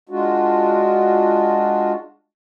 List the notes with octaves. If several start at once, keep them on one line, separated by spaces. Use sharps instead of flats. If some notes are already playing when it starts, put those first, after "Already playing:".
G#3 D4 F4 F#4